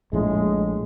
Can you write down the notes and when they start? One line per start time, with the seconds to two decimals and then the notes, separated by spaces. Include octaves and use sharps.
0.13 A#1 A2 G#3